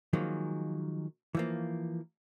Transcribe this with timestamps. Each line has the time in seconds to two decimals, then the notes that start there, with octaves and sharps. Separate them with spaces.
0.13 D#3 F3 F#3 G#3 A#3
1.35 E3 F3 A#3